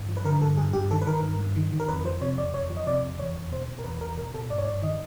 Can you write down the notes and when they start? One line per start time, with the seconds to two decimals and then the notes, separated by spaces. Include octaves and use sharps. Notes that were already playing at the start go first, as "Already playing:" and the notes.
Already playing: G2
0.08 F3
0.17 B4
0.24 D3 A#4
0.42 G2 A4
0.57 G2 G#4
0.73 G2 G4
0.91 D#3 A4
1.02 B4
1.06 D#3 A#4
1.23 G2
1.39 G2
1.56 D#3
1.72 D#3
1.80 A#4
1.88 F2 B4
2.04 F3 C5
2.21 C3 C#5
2.38 F2 D5
2.54 F2 C#5
2.70 F3
2.77 D#5
2.87 C3 D5
3.02 F2
3.19 E2 C#5
3.36 E2
3.52 B2 C5
3.68 B2
3.79 A#4
3.84 E2 B4
4.01 E2 A#4
4.17 B2 A#4
4.34 B2 A4
4.50 G2 D5
4.58 C#5
4.65 G2 D5
4.82 D#3 D#5